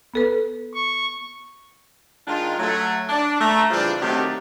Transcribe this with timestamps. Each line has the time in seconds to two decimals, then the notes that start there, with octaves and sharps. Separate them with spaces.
0.14 B3 A4 B4
0.74 C#6
2.28 D#3 G#3 D4 F4
2.59 F#3 A3
3.09 D4
3.41 A3 A#5
3.71 C#3 E3 F3 G3 C4 D4
4.01 C3 D#3 F#3 A3 D4 G4